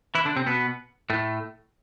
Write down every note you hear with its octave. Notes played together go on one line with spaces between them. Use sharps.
E3 E4
D3 D4
C3 C4
B2 B3
A2 A3